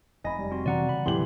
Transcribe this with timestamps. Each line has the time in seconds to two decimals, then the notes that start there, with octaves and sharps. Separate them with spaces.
0.24 F1 D#4 D#5 G#5 B5 A#6
0.39 G3
0.51 C4 F#4 C6
0.66 C3 E3 C4 D5 F#5 A#5
0.89 C#3 B5
1.06 D2 A2 E3 F#3 G4 C6 F#7